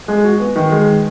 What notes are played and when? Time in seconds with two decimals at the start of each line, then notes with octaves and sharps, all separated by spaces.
0.08 G#3
0.24 F#4
0.39 B3
0.56 D#3
0.71 G#3